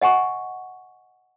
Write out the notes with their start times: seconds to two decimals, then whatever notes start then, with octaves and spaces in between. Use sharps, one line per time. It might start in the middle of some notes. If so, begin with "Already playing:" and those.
0.02 D#5 F#5 G#5 C#6